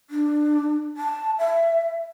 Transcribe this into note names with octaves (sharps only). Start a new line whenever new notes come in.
D4
A5
E5